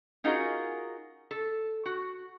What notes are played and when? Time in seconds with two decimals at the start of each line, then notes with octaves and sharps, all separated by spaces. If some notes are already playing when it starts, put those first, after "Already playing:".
0.24 C#4 D#4 F4 F#4 G#4 A#4
1.31 A4
1.86 F#4